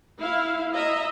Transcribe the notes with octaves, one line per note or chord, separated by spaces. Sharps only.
E4 F5
D#5 E5 A#5